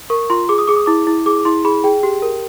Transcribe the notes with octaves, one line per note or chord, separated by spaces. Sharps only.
A#4 C#6
F4 C6
G#4 D6
D#6
G#4 D6
D#6
E4 D6
E4
G#4 D6
E4 C6
G#4 B5
G#4 G5
G4
A#4